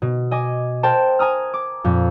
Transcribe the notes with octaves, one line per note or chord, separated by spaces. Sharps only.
B2
D#5 G#5 D6
A#4 C5 G5 A5
G#5 A#5 D#6 F6
D6
F2 A#2